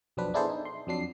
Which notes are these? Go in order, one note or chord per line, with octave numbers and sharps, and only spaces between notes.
B1 F2 F#3 C4 D4 B4
B3 D4 E4 G#4 A4 C5
D4 D#4
C6
F2 F#3 D4 C7